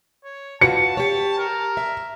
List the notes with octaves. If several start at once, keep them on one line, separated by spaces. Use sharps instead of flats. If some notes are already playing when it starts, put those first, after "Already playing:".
C#5
F4 F#4 B4 A5 C#7
G4 C#5
A#4
E5